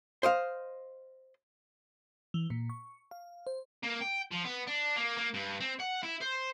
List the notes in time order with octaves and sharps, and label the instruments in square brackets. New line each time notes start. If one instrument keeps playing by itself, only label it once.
[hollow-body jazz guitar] C5 D#5 F5
[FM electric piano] E3
A#2
C#6
F5
C5
[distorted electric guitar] A#3
G5
F3
B3
D4
A#3
A#3
G2
C4
F#5
E4
C5